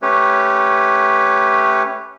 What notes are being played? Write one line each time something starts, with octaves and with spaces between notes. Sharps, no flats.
A3 C#4 G4 B4 C#5